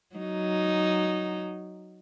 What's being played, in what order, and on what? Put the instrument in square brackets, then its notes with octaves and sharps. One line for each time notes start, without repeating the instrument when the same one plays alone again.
[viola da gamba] F#3 D#4